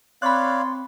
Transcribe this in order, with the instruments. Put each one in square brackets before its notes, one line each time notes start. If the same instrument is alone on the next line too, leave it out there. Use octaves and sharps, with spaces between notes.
[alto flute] C4 [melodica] C#5 D5 F5 [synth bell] B5 F#6 [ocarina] C6